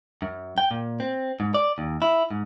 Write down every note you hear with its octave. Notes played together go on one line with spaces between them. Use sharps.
F#2
G5
A#2
C4
G#2
D5
D#2
E4
G#2